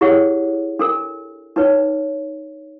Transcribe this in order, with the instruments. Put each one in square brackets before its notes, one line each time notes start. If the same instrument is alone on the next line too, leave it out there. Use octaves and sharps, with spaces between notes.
[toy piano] E4 G4 G#4 C#5 F#5
D4 A4 A#4
D4 D#4 B4 C#5